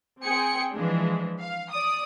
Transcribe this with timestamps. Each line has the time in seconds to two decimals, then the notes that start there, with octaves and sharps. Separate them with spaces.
0.23 C4 G#4 G5 C#7
0.73 E3 F3 G#3 D4
1.39 F5
1.70 D5 D#6